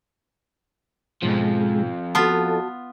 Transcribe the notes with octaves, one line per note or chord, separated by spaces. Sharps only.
F2 G#2 B2 F3 G#3
B3 F4 F#4 A4 A5